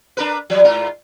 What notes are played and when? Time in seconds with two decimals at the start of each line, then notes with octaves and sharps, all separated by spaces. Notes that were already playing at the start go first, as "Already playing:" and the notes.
0.17 D4 A#4 B4
0.50 F3 G3
0.64 G#2 F4 A#4